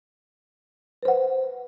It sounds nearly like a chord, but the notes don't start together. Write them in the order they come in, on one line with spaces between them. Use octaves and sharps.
B4 C5 F#5